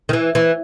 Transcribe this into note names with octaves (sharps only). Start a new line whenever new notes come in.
D#3
E3
E3